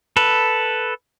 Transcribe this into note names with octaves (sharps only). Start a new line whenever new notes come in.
A4 B4